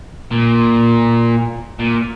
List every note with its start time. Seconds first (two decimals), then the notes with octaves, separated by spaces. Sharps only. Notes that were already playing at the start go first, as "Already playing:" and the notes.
0.31 A#2
1.79 A#2